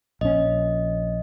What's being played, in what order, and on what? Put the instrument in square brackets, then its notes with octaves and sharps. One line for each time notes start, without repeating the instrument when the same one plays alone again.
[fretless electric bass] A#1 C#4 [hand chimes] D#5